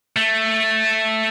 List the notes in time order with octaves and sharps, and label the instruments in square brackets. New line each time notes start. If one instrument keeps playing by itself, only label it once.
[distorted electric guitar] A3